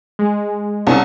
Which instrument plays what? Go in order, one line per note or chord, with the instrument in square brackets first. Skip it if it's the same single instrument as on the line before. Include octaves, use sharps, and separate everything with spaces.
[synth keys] G#3
[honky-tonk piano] C2 C#4 A5